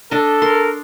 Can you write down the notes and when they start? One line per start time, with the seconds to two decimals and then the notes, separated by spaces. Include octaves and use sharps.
0.11 D4 A4 D#5
0.42 A#4 C6